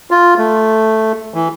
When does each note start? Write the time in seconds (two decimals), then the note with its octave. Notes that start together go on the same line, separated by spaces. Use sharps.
0.11 F4
0.38 A3
1.34 E3